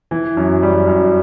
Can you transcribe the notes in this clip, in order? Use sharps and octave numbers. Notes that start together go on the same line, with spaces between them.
E3
F#2
G3
F#2